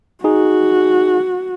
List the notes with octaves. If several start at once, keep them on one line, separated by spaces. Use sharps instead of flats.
D#4 F#4 G#4